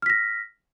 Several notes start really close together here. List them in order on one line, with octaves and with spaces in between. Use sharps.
F6 B6 A#6